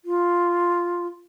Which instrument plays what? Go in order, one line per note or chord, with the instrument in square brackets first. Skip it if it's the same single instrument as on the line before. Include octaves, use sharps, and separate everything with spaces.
[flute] F4